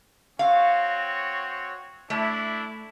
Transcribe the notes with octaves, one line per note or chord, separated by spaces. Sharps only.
C4 F#4 C#5 F5
A3 D4 E4